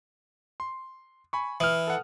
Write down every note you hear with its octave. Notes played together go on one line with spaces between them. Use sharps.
C6
G#5 B5 C#6
E3 D#6 F6
A4 F#5